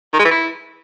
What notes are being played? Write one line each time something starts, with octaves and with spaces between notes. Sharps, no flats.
D#3
G#3
E3
E4